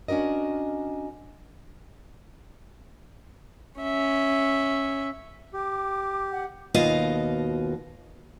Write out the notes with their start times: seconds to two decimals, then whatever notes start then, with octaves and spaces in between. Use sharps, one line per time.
0.08 C#4 D4 F#4 A#4 D#5
3.81 C#4 E5
5.54 G4 D6
6.32 F#5
6.74 D#2 B2 F4 F#4 D#5 F5